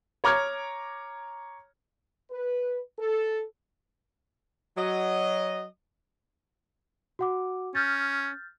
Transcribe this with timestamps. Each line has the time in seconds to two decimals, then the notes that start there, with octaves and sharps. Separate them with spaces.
0.24 C#5 A#5 D6 F6 G#6
2.31 B4
2.99 A4
4.77 F#3 D#5
7.19 F#4 F#5 D6
7.75 C#4 F6 G6 A6